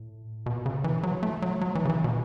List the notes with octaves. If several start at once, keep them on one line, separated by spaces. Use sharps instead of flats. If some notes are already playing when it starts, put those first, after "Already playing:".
Already playing: A2
B2
C#3
E3
F#3
A3
F#3
F#3
E3
C#3
E3
B2